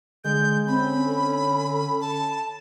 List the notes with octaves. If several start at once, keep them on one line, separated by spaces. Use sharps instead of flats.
D3 G#3 G6
C4 C#4 B5
A4
A5